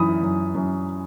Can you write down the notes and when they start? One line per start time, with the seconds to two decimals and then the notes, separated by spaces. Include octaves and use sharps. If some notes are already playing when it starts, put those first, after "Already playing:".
Already playing: F#2 E3 B5 D#6
0.23 F#2
0.55 F#2